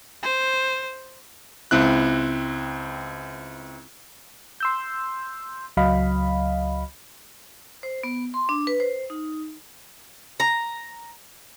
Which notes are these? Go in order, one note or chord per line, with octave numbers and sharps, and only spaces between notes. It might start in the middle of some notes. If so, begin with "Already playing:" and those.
C5
C#2 C4 E4 F#6
C6 E6 G6
C#2 F#3 D#5 F5 B5
C5
B3
C6
D4
B4
C5
D#4
A#5